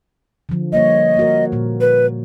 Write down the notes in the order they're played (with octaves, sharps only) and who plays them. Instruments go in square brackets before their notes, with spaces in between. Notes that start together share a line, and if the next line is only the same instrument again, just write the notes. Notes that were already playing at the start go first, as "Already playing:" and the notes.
[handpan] D3 F3
[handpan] G3 A#3 C#5 [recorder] D#5
[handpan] A#3 F#4 A#4
A#2 A#3
[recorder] B4